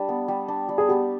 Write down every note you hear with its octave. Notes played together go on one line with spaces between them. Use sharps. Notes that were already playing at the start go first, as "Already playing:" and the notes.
Already playing: G3 D4
B3
G3
D4
G3
G#4
B3 G4